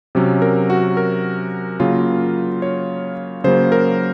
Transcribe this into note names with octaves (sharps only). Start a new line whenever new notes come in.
C3 F#3 C#4
A#4
F#4
A#4
C#3 F#3 A#3 F4
C#5
C#3 F#3 A#3 C5
A#4